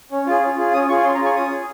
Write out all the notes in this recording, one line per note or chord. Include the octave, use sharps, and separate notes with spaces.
C#4
F4 G#4
C#4
F4 G#4
C#4 D#6
F4 G#4 C#6
C#4 C6
A#5
F4 G#4 C#6
C#4 D#6
G#4